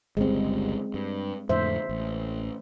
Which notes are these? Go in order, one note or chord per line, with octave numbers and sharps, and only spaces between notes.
G1 C#2 G3 G#3 C4
G2
F2 A2 D3 C5 E5
A1